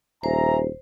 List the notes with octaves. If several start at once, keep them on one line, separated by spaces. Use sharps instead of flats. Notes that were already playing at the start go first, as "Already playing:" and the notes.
D#1 C5 E5 G#5 A#5